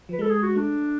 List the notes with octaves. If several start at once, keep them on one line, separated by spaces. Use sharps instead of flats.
F3 B4
G#3 A4
G#4
F#4
A3 D4